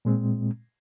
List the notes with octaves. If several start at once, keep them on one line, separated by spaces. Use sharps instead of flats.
A#2 G#3 C4